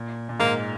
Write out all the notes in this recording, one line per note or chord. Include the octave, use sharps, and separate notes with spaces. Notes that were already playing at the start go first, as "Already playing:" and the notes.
Already playing: A#2
A#2
G#2 A#3